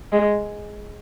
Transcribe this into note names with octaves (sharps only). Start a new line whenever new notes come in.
G#3